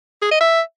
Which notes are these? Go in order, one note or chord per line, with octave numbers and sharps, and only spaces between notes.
G#4
D#5
E5